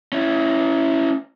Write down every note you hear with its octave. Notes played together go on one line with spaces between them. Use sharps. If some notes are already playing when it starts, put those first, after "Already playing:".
C#4 E4